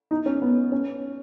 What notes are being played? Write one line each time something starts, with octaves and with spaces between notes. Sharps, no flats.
D#4
C#4
B3
C#4